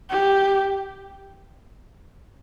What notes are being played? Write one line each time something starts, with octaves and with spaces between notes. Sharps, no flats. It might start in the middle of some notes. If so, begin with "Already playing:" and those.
G4